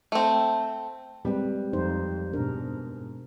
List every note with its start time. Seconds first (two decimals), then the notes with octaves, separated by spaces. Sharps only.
0.12 A3 C4
1.25 G3 G#3 C4 B4
1.73 F2 D#4 C5
2.33 G#2 B2 D4 A#4